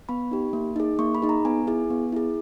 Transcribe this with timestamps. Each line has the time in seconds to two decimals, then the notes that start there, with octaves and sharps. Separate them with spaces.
0.09 B3 B5
0.31 D#4 G4
0.53 A#3
0.76 D#4 G#4
0.99 A#3 C#6
1.15 B5
1.22 D#4 G#4
1.29 A#5
1.45 B3 G#5
1.67 E4 G#4
1.90 B3
2.13 E4 G#4